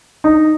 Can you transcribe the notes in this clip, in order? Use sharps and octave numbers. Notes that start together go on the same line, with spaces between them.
D#4